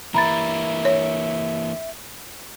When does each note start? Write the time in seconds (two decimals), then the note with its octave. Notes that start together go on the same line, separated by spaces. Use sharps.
0.14 E3 A#3 E5 A#5 B5 A6
0.85 C#5